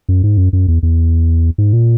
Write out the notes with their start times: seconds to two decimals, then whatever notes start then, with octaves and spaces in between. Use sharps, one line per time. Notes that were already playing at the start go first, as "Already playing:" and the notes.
0.09 F#2
0.24 G#2
0.37 F#2
0.53 F#2
0.68 E2
0.83 E2
1.58 G#2
1.73 A#2